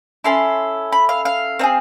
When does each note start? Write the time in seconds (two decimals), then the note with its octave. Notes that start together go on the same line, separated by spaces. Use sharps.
0.24 C#4 E4 A4 C6
0.92 B5
1.09 F5
1.25 F5
1.59 C4 D#4
1.63 G#4